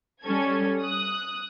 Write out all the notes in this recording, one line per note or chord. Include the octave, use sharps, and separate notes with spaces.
G3 C#4 A4 G#6
D#6 F#6